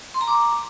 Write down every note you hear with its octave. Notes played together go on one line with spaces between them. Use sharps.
C6
A#5
D6